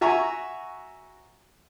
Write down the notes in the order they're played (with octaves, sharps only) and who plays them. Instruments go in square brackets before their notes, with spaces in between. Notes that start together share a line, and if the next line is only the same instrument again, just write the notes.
[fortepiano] F#4 E5 G#5 A#5 C#6